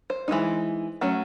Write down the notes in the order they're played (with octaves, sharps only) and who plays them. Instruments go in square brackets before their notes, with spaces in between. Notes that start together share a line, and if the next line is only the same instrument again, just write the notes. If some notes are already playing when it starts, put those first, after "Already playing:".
[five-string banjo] C5
E3 G#3 C4 D#4
F#3 A3 C#4